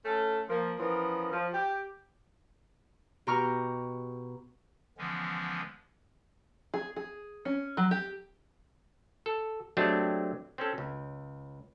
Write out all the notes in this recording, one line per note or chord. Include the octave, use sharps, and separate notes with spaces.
A3 C#4 A4
F3 A#3
E3 F3 B3 C#4 A#4
F3
G4
B2 G4 A#5 C#6 F6
D3 E3 F3 G#3 B3 C#4
G#4
G#4
C#4
F#3
G4
A4
F#3 G#3 A3 C4 D4 G4
C4 C#4 A4
C#2